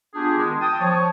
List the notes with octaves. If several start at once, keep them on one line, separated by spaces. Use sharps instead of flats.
B3 D4 F4 G4 G#4
D#3 G#3
G5 A5 D#6
F3 C#5